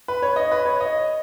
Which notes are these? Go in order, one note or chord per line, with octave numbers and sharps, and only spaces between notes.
B4
C#5
D#5
B4
C#5
D#5